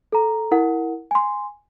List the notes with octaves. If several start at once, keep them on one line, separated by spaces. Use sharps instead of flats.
A4 A#5
E4 A#4 F#5
G#5 C6